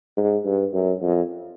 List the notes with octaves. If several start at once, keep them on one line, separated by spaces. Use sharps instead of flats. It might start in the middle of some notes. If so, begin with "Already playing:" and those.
G#2
G2
F#2
F2